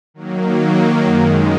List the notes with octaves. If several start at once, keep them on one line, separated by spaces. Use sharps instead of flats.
D#3 F#3 A#3
F#2 D#3 G#3